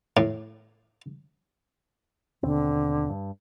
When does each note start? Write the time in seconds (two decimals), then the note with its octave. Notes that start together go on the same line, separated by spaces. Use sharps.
0.17 A2
2.43 D#2 B2 D3 C4
3.10 G2